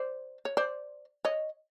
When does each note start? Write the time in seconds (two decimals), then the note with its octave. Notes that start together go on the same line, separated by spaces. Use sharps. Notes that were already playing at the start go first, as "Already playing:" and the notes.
Already playing: C5 D5
0.45 C#5
0.57 C5 D5
1.25 C#5 D#5